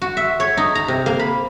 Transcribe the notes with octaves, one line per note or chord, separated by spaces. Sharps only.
F#4
E5
C#5
D#4
A#5
C3
A#3
B5